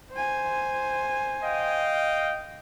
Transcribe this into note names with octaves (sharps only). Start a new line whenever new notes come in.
C5 G#5
D#5 F5 G5